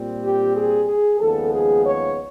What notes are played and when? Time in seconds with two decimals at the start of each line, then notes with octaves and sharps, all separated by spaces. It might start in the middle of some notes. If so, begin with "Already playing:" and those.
Already playing: A#2 G3 C4
0.22 G4
0.54 G#4
0.87 G#4
1.19 D#2 C#3 F3 G#3 B3 A4
1.52 G#4
1.84 C#5